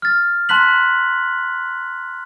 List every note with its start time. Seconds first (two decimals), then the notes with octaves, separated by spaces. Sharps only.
0.02 F6 A6
0.49 A5 A#5 C6 F#6 B6 F#7